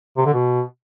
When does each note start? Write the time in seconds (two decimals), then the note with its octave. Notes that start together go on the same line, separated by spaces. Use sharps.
0.17 C3
0.25 D3
0.34 B2